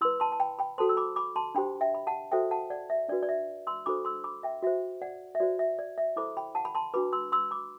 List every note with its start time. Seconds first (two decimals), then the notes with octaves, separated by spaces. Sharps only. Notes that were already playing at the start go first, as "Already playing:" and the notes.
0.01 E4 C6 E6
0.05 B4
0.20 A5 C6
0.32 A5
0.40 G5 B5
0.59 G5 B5
0.78 F#4 A4 C5 A5 C6
0.89 E6
0.97 B5 D6
1.16 B5 D6
1.36 A5 C6
1.55 D4 G4 C5 G5 B5
1.81 E5 G5
1.95 B5
2.07 F#5 A5
2.32 F#4 A4 C5 E5 G5
2.51 F#5 A5
2.70 D5 F#5
2.90 E5
3.09 D4 F#4 B4 D5
3.23 D5
3.29 E5
3.67 C6 E6
3.86 D4 F#4 A4 C5 B5 D6
4.05 C6 E6
4.24 B5 D6
4.43 E5 G5
4.63 F#4 C5 E5
5.02 D5 F#5
5.35 E5
5.40 F#4 C5 D5
5.59 E5
5.79 D5
5.98 E5
6.16 E4 A4 C5 B5 D6
6.37 G5 B5
6.55 F#5 A5
6.65 B5
6.75 A5 C6
6.94 D4 F#4 B4 B5 D6
7.13 C6 E6
7.32 C6 E6
7.51 B5 D6